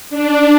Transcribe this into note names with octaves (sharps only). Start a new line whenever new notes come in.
D4